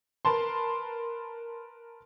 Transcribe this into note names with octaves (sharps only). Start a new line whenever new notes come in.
A#4 B4 A5 C6